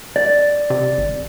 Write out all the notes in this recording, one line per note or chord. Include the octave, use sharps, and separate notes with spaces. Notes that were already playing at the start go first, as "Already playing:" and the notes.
D5
C3
G#1